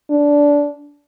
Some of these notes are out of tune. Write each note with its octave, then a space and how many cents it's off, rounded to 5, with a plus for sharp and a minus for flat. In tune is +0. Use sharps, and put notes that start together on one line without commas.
D4 -15